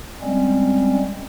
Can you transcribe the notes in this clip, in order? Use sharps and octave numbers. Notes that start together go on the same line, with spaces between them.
G3 G#3 C4 C#4